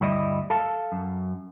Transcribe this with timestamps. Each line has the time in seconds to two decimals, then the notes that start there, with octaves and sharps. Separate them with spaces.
0.01 D2 G2 G3 E4 D#5
0.50 A4 F5 A5
0.92 F#2